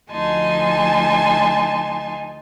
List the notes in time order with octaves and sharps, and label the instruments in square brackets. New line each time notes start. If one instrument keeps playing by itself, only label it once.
[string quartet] D2 F3 D#4 G#5 A5 C6